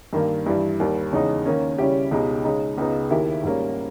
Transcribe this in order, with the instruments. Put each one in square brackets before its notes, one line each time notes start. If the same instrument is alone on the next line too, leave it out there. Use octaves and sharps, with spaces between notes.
[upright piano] G2 D#3 A#3
G2 E3 G3
D#2 D#3 G3
E2 C#3 G#3 D#4
D#3 A#3 C#4
C#3 G3 C#4 E4 G4
C#2 B2 G#3 D#4 G4
C#3 G#3 D#4
C#2 C#3 G#3 B3 D#4
D#2 D#3 A#3 E4 G4
G#2 G3 A#3 C#4